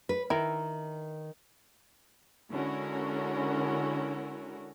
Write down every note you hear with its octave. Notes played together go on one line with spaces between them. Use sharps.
B4
D#3 E4 A#4
D3 G#3 C#4 E4 F#4 A#4